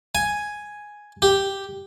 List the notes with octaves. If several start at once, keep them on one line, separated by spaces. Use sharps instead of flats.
G#5
G4